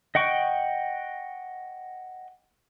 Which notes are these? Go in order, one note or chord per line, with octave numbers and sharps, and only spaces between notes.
D#5 F#5 G5 C#6